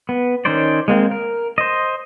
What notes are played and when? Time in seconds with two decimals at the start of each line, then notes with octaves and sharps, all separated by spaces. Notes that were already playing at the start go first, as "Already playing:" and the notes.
0.09 B3
0.45 D#3 C#4 D#4 C5 D5
0.88 G#3 A#3 C4
1.11 A#4
1.58 C5 D#5